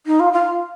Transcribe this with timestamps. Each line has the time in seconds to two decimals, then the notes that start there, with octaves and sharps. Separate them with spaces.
0.06 D#4
0.20 F4
0.33 F4